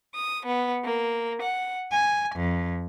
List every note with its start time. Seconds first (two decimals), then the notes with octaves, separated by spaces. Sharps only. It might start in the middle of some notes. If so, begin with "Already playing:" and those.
0.13 D#6
0.45 B3
0.84 A#3
1.41 F#5
1.91 G#5
2.36 F2